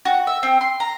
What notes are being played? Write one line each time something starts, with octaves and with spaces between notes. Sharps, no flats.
F#4
E5
C4
C6
A#5